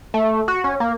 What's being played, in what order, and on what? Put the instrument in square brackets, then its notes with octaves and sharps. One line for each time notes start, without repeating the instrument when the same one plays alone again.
[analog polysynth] A3
F#4
C#4
A#3